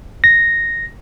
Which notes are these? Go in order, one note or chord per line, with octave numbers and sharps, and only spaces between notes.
A#6